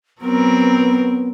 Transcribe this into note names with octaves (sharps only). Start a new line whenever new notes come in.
F#3 B3 C4 A#4